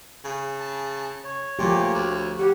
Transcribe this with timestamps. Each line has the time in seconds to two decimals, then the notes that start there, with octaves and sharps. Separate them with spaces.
0.24 C#3
0.60 A5
1.24 C#5
1.59 A#2 F3 A3 G4
1.95 D2
2.39 G4 F#5